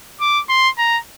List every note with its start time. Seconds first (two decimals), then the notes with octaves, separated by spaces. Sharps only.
0.21 D6
0.49 C6
0.78 A#5